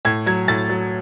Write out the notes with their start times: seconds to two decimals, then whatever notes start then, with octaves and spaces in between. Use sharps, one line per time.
0.05 A2 G#6
0.26 F#3 G#6
0.48 A2 A6
0.69 F#3